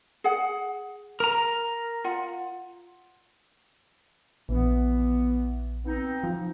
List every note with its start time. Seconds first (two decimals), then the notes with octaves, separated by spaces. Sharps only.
0.24 G#4 F#5
1.20 A#4 A#5
2.04 F4 F#5
4.49 A#1 E3 B3
5.85 B3 C4 D#4
6.24 F3